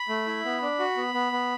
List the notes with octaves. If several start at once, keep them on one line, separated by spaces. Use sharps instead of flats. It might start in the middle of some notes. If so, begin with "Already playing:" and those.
Already playing: B5
A3
E4
B3
D4
F#4
B3
B3
B3